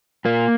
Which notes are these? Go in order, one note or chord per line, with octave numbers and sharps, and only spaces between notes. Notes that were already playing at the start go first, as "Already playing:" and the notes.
A#2 A#3